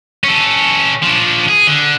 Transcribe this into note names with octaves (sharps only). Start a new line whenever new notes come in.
C#4 A4
F3 D4
G#4
D3